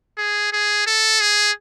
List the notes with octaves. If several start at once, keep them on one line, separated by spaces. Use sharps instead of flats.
G#4
G#4
A4
G#4